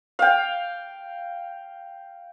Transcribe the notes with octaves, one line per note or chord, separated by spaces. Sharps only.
F5 G5